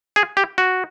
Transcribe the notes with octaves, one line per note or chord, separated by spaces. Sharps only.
G#4
G4
F#4